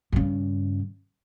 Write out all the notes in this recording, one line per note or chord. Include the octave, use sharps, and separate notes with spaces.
G2 C#3